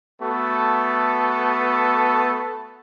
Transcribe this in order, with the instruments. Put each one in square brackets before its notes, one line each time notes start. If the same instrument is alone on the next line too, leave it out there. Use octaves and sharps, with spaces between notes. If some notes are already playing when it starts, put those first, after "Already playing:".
[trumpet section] A3 B3 F#4 A4